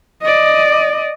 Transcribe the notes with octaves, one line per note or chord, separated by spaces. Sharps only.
D5 D#5